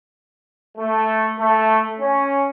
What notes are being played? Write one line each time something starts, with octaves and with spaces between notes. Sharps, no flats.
A3
A3
C#4